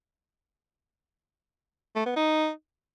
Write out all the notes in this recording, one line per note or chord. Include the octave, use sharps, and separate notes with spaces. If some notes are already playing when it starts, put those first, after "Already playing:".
A3
B3
D#4